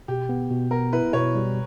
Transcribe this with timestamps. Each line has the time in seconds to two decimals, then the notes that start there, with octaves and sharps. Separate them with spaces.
0.08 B2 G4
0.29 B3
0.51 B2
0.71 B3 A#4
0.93 E4 B4
1.13 B2 C#5
1.35 G3